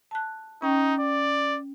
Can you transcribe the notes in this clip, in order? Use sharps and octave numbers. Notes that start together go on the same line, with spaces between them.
A5 F#6
C#4 D#4 G5
D5